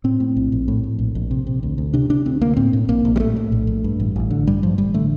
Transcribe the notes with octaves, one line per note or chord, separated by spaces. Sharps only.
A2 C4
A2
A#1
A#1
A2
A2
A#1
A#1
C3
C3
D2
D2
C3 D4
C3 D4
D2 C4
D2 A#3
A2 C4
A2
A#1 A#3
A#1
G3
A2 A3
A2
A#1
A#1
G2
A1
A1
D3
G2 G3
A1 F3
A1 G3
D3 A3